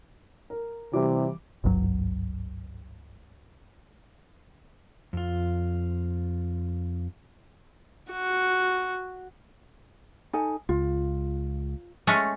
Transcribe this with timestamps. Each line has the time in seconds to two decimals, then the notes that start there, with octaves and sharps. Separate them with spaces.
0.50 A#4
0.93 C3 E3 G3 D6
1.64 G#1 C#2 G2 F#3
5.13 F2 F4
8.12 F#4
10.33 D#4 A4 G#5
10.69 C#2 F4
12.07 G#3 A3 C#4